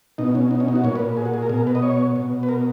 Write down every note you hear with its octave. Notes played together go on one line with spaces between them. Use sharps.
B2 D#4
C#4
D#4
C#4
D#4
F#4
A#2 C#5
B4
G#4
F#4
G#4
A#4
B2 G#4
A#4
B4
D#5
C#5
B2
B4
A#4